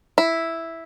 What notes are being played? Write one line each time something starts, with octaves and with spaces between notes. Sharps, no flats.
E4